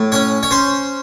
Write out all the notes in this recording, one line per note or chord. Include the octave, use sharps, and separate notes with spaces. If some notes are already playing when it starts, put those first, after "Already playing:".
Already playing: A2
C#4 C#5
C#5
C#4 C5